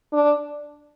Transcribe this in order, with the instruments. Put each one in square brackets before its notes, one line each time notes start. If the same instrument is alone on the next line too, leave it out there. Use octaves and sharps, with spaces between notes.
[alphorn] D4